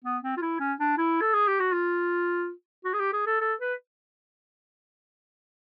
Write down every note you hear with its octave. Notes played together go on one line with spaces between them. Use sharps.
B3
C4
F4
E4
C#4
D4
E4
A4
G#4
G4
F#4
F4
F#4
G#4
G4
G#4
A4
A4
B4